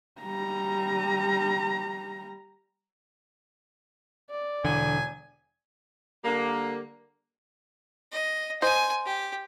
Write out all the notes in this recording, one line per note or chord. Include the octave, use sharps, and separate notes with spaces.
G3 A#5
D5
E1 D3 G#5 D#7
D3 G3 A#3
D#5
C5 D#5 G#5
G4